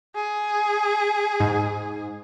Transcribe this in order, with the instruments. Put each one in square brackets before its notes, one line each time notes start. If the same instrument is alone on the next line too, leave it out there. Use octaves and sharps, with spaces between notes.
[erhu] G#4
[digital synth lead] G#2